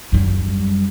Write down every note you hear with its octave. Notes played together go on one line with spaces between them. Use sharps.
F#2 G3